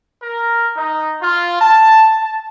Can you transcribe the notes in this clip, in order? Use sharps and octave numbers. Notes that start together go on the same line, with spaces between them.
A#4
D#4
F4
A5
A5